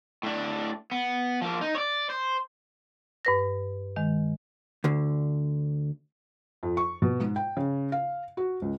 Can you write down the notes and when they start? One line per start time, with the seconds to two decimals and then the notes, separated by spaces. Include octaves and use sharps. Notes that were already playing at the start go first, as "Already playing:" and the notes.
0.23 A2 D4
0.92 B3
1.42 F3 A#3
1.61 D#4
1.75 C#5 D5
2.10 C5
3.25 G2 B4 A#6
3.96 D#3 G#3
4.84 D2 D3
6.63 F2
6.77 C#6
7.02 B2
7.20 G#2
7.36 G5
7.57 C#3
7.92 F5
8.37 F#4
8.62 C#2